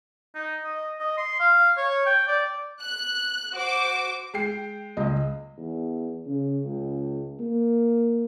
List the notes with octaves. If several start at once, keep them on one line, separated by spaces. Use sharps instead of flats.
D#4
D#5
D#5
C6
F5
C#5
G5
D5
F#6
F#4 C5 D6
G#3 G5 C7
C#2 D#5
E2
C#3
C#2
A#3